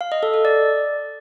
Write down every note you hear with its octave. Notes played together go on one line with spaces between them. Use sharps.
F5
D#5
A4
A4
D5